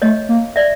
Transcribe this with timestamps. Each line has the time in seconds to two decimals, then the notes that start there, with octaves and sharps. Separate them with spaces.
0.02 A3 C#5 D#5
0.29 A#3
0.56 D5 E5